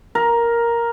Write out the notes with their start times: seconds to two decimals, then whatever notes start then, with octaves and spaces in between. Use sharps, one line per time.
0.15 A#4